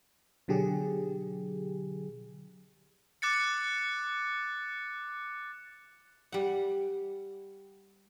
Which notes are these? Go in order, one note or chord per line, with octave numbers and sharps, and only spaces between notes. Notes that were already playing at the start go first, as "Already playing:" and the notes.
B2 D3 F#3 G4 G#4
D6 F#6 A6 C#7
G3 F#5